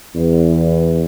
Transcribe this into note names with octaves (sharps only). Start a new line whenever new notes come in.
E2